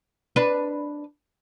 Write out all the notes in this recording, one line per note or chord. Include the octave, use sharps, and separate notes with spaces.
D4 B4